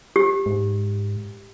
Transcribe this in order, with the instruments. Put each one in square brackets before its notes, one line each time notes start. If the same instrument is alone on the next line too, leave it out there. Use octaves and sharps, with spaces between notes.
[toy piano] G4
[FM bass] G#2